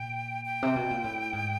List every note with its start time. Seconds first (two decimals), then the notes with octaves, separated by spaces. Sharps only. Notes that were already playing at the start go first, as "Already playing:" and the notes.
Already playing: A#2 G5
0.45 G5
0.62 C3
0.76 B2
0.91 A#2
1.04 A2
1.33 G#2